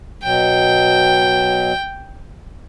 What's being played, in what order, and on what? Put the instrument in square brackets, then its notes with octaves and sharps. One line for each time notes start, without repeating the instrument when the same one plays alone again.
[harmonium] B2 F#3 [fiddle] G5